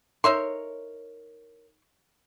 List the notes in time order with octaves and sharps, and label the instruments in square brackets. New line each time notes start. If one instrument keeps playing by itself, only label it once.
[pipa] D#4 E5 C6 [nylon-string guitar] A#4 C#5